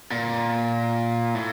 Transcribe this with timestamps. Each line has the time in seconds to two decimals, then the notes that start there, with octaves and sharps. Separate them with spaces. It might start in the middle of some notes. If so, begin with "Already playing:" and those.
0.12 A#2
1.35 A2